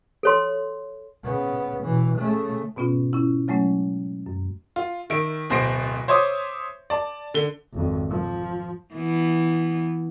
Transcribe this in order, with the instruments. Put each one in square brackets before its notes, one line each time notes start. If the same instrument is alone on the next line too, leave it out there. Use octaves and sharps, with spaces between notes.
[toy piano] A4 C#5 C6
[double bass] C#3 B3
B2 E3
C#3 A3
[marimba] G#2 B2 B3 C#4 F4
C#4 E4
C#3 F#3 G#3 A3 C#4
F#2
[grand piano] F4
D#3 E5 D7
D1 B2 C5 A#6 C7 D7
C5 C#5 E5 C6 D6 D#6
D5 A5
D3 G7
[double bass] G#1 F2
F3
[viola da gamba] E3 B3